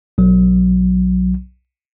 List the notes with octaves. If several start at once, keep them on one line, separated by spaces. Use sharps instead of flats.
B1 F#3